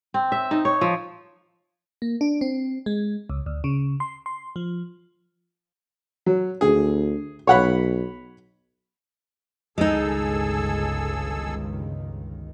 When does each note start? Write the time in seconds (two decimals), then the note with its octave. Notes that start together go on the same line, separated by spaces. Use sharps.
0.14 C4
0.32 E5
0.51 D#4
0.65 C#5
0.81 F3
2.02 A#3
2.21 D4
2.41 C4
2.86 G#3
3.30 C#2
3.46 D2
3.64 C#3
4.00 C6
4.26 C6
4.56 F3
6.26 F#3
6.61 D2 G#4
7.47 B1 C#5 F#5 B5
9.78 G1 C#2 D#3 G#3 D#4 G#4 A4 E6